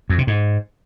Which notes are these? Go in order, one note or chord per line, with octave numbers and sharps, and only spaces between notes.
F2
C3
G#2